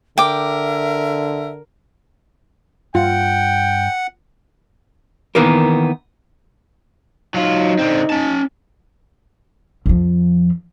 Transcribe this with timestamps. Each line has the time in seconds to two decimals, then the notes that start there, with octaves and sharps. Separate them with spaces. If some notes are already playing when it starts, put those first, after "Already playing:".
0.18 D3 A#4 E5 G5 D6
2.95 G2 F4 F#5 G5
5.35 D#3 E3 A#3 B3 A#4
7.34 F#3 D#4 F4
7.79 D3 C4
8.10 C#4 A5
9.86 F2 F3